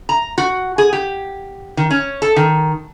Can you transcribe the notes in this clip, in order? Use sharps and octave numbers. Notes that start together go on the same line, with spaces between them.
A#5
F#4
G#4
G4
D#3
C#4
A4
D#3